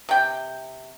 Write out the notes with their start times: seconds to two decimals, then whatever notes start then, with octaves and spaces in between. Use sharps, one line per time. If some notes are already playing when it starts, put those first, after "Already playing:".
0.09 C3 G5